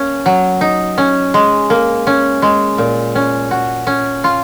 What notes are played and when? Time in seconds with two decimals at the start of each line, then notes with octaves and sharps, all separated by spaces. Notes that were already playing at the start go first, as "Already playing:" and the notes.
Already playing: A#3 C#4
0.26 F#3
0.61 D#4
0.98 C#4
1.34 G#3
1.70 A#3
2.07 C#4
2.42 G#3
2.78 A#2
3.15 C#4
3.51 F#4
3.87 C#4
4.24 F4